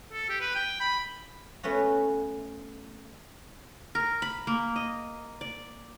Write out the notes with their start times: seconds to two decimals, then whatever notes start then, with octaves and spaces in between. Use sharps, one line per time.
0.13 A4
0.29 G4
0.41 B4
0.55 G5
0.80 B5
1.63 A3 B3 C#4 F#4
3.95 A#4
4.22 B5
4.47 A#3
4.76 D#5
5.41 D5